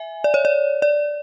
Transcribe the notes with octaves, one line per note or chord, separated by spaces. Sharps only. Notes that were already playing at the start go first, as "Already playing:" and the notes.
Already playing: E5 G#5
D5
C#5
D5
D5